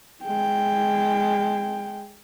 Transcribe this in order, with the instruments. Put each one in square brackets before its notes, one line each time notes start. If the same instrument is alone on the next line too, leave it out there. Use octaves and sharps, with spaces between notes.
[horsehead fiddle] G#3 G5